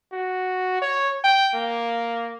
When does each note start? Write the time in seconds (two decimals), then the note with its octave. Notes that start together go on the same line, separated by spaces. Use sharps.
0.12 F#4
0.82 C#5
1.24 G5
1.54 A#3